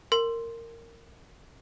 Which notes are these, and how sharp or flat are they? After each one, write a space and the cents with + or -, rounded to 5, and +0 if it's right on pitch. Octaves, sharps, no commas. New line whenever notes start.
A#4 -20 C6 +0